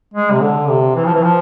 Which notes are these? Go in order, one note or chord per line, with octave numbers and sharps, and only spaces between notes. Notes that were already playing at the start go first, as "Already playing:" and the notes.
G#3
C3
D3
C3
E3
F3
E3
F3